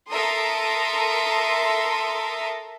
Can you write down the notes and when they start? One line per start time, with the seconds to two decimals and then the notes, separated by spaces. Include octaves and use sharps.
0.11 A4 A#4 E5 A#5 C6 D#6